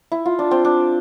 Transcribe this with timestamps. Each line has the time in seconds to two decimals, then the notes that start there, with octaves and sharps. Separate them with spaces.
0.12 E4
0.26 F4
0.39 D4
0.51 C4
0.65 D4